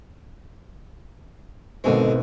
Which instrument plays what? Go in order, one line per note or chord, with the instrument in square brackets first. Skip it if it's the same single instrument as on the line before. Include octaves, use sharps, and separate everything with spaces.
[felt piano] G#1 B2 C4 [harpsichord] D3 G#3